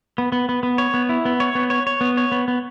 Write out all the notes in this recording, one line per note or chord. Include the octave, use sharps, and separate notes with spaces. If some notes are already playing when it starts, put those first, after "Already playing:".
B3
B3
B3
B3
C#5
B3
E4
B3
C#5
B3
C#5
C#5
B3
C#5
B3
B3